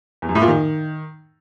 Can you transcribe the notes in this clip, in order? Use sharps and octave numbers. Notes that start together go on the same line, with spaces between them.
E2
F#2
A2
A#2
D#3